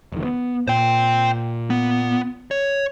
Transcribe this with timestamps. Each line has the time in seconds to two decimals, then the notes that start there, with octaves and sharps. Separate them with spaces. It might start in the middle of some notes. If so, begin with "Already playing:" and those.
0.12 F1 D#3
0.24 B3
0.68 A#2 C5 G5
1.70 B3
2.51 C#5